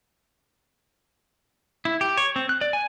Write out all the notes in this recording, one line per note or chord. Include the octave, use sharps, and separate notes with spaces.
E4
G4
C#5
C4
F#6
D5
G#5